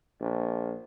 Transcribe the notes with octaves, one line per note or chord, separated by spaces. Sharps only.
A#1